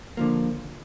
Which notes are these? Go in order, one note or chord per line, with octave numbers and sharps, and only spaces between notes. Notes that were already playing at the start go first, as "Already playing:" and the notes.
D3 F3 A#3